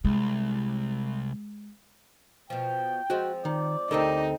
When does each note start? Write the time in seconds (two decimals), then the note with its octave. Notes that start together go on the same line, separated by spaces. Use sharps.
0.05 C2 G#3
2.50 B2 F3 G5
3.10 F3 G#3 C4 F#4
3.45 D#3 D5
3.91 D2 C4 D#4 G4 A4 A#4 D#5